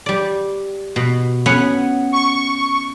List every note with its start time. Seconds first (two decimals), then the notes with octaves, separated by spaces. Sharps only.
0.06 G3 D5
0.96 B2
1.46 B3 C#4 F#5
2.12 C#6